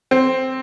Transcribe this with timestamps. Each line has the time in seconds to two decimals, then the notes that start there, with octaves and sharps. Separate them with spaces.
0.11 C4